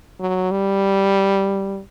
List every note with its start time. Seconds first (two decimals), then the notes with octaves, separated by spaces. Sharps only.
0.20 F#3
0.51 G3